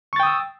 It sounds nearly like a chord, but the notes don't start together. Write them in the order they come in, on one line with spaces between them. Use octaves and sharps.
C#6 A6 G5 D#6 E6